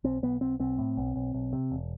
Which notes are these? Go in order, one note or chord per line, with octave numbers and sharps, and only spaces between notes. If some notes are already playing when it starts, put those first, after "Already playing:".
B1 C4
B1 B3
B1 C4
B1 C4
A2
B1
B1
B1
C3
E1